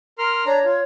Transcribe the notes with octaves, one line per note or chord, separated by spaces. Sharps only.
A#4 C6 F6
D4 C#5 A#5
F4